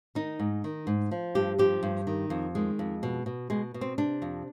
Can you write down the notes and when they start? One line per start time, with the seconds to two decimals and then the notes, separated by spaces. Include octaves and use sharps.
0.15 D#3 D#4
0.40 G#2
0.64 D#3
0.87 G#2
1.11 F3
1.35 G2 G4
1.58 F3 G4
1.83 G2
2.07 D#3
2.30 F2
2.55 D#3 G#3
2.79 F2
3.03 B2
3.26 B2
3.50 B2 G#3
3.74 B2
3.81 C4
3.98 C3 D4
4.22 F2